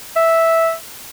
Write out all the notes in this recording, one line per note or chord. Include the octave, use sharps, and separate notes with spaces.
E5